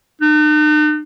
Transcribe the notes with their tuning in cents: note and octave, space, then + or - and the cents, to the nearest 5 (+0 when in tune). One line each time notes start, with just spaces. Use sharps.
D#4 -45